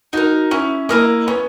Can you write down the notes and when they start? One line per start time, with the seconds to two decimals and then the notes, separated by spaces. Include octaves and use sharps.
0.13 D#4 F#4 A#4
0.51 C#4 E4
0.89 A#3 E4 A#4 D#5
1.27 B3 C#4